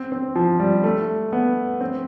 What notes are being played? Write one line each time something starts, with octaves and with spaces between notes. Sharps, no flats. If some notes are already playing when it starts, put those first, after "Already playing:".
Already playing: C4
C4
F3
G3
A3
B3
C4